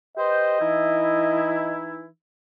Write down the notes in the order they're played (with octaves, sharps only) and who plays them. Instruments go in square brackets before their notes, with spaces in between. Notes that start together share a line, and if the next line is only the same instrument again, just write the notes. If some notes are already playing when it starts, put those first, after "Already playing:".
[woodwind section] G4 B4 C5 [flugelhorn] D#5
[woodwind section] E3 D#4 E4